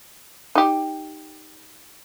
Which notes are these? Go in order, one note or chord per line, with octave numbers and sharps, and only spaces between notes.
D#4 G4